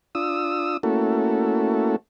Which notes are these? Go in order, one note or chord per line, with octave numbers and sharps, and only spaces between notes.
D4 F4 D#6 E6
A3 A#3 C#4 E4 F#4 A4